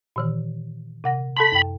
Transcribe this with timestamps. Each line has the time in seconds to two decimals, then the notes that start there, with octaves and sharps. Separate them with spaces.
0.16 A#2 D#3 E3
1.04 C3 F#5 A#6
1.37 A4 A5 B5 C6
1.52 F#2 G5